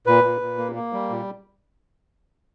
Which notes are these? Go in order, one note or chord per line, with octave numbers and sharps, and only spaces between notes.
A#2 B4
A#2
A#2
A#3
A#3
G3
A#2